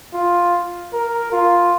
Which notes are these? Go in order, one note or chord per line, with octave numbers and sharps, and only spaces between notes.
F4
A#4
F4